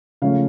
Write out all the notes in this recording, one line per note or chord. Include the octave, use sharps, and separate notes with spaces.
C#3 F3 A3 C#4 F5